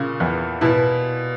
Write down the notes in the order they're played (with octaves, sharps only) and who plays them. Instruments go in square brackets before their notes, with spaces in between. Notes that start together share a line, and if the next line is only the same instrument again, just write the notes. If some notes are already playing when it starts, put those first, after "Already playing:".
Already playing: [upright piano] A#2 [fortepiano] C#3
[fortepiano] E2
[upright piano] B2 [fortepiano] E4